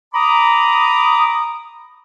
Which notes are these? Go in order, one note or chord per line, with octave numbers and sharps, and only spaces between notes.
A#5 B5 D6 D#6